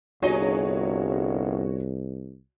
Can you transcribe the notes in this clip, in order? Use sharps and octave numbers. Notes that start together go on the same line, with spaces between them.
G1 C2 D4 F#4 G#4 C#5 D#5